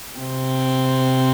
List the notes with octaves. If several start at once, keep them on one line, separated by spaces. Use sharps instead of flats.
C3 C4